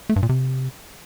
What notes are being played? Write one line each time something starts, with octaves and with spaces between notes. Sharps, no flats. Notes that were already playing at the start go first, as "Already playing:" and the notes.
A3
G2
A#2
C3